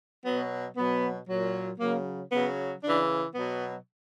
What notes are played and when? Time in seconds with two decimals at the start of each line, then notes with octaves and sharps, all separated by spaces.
0.26 B2 F#3 B3
0.77 B2 F#3 B3
1.29 A#2 F#3
1.80 C#3 F#3 A#3
2.32 C#3 F#3 B3
2.83 C#3 E3 D4
3.34 B2 F#3 B3